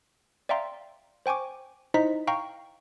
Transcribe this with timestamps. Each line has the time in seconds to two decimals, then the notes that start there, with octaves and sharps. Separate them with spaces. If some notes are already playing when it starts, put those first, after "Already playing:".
0.49 D5 E5 F5 G5 A#5 C6
1.26 C5 G5 G#5 C#6 D6
1.94 D#4 E4 C5 D#5 A#5 B6
2.27 F5 G5 A#5 C#6